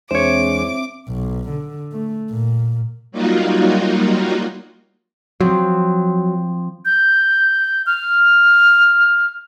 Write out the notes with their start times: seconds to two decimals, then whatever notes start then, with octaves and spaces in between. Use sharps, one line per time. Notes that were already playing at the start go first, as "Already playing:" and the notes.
0.11 E2 G#3 C4 D4 C5 C#5 E5 D6
1.08 B1
1.49 D3
1.92 A3
2.30 A#2
3.11 F#3 G3 A#3 D#4 F4 F#4
5.41 F3 F#3 C4
6.85 G6
7.86 F6